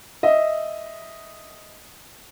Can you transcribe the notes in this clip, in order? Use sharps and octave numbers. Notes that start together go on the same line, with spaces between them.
D#5 E5